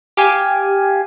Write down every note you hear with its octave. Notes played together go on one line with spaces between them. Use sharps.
G4 F5 G#5